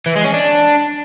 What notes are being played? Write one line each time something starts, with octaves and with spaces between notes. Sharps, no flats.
E3
G#3
C#4
D4